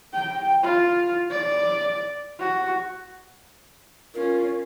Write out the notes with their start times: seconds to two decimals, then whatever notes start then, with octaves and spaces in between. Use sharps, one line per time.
0.14 G5
0.63 F4
1.31 D5
2.39 F#4
4.14 C#4 F4 A#4